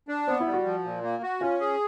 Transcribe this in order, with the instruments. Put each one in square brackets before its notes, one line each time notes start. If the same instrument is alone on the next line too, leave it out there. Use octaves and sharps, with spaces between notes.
[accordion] D4
[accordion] B3 [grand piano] C4
[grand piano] E4
[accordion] G3
[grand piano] F#4
[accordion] F3
A#2
A#3
F#4
[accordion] C#4 [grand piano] F4
[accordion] G#4